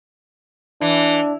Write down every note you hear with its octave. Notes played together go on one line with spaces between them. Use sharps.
E3 D4